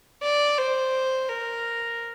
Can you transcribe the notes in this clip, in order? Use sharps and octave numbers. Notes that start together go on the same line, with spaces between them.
D5
C5
A#4